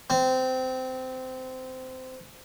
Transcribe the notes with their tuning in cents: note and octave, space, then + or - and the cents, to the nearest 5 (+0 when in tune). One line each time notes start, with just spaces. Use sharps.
C4 -20